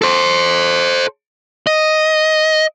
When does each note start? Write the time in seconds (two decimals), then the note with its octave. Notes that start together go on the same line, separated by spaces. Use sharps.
0.02 A4 C5
1.67 D#5